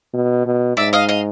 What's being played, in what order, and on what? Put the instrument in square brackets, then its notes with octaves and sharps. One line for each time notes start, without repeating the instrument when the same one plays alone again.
[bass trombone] B2
B2
[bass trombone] G#2 [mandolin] D5 E5
[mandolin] D#5 F5
D#5 F5